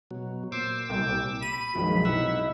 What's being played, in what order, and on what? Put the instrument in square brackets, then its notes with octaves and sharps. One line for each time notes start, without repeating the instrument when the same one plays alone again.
[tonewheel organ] B2 F#3
[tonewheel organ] A#2 D6 E6 [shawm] C5
[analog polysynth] C2 [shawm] G5
[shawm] B5 [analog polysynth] D#7
[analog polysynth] B1 [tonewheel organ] F#2 D#3 [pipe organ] F3 F#3 G#3
[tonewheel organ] C3 F#5 E6 [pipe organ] D#4 E4 E5